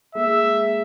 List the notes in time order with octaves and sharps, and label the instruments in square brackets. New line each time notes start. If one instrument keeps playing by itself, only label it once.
[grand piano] G#3 A#3 [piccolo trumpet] E5